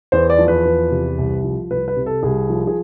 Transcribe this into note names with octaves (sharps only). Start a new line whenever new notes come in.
E2 C5
D5
F3
B4
E2
C3
C2
F3
C2 B4
B4
C3
A4
C2 G#4
F3
G#4